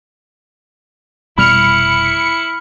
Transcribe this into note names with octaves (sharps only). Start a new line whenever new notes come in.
F1 B2 G3 E4 B5 F6 C#7 F7